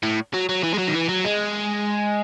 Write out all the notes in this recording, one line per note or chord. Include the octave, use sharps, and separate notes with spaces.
A2
F#3
F#3
E3
G#3
F#3
D#3
E3
F#3
G#3